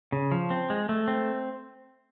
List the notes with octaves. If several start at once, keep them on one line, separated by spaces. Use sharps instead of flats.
C#3
F3
C4
G#3
A3
C4